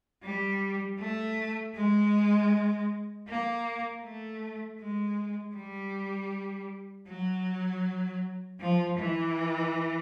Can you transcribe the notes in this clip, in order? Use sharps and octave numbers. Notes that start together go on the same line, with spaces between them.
G3
A3
G#3
A#3
A3
G#3
G3
F#3
F3
E3